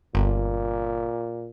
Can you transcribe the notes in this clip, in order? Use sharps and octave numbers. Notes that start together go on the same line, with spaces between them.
G1 A#2